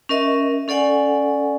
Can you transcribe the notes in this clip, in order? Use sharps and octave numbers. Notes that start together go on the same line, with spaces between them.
C#4 A#4 D#5 E5
C#4 A4 D5 F#5 G#5